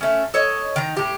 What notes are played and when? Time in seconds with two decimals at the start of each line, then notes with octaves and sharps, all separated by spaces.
0.01 A3 C#4
0.34 A4 C#5 D#5
0.76 D#3 A#5
0.97 A2 G4